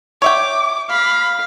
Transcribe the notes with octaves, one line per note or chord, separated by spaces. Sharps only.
C#5 E5 G5 D6
F5 B5